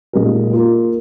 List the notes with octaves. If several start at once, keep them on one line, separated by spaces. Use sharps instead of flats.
A#2 G#3 D#4 A#4
A#3 F4 A#4